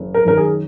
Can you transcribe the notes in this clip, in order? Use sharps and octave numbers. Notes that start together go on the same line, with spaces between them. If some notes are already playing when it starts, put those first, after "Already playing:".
Already playing: F#1
A#4
F#2 D#3 A#4
G#4